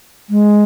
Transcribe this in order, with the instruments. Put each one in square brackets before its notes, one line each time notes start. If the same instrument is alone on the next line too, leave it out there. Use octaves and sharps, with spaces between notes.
[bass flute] G#3